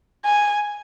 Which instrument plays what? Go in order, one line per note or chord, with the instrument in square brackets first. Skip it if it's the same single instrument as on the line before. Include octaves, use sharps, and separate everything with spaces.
[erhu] G#5